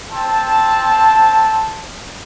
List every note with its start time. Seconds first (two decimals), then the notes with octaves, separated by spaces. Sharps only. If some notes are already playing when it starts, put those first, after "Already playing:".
0.12 C4 A5